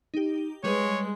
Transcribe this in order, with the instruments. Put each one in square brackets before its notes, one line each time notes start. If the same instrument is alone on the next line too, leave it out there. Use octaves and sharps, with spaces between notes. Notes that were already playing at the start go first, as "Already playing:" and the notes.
[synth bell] D#4 G4
[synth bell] G3 G#4 B4 [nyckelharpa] G#3 [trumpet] C#5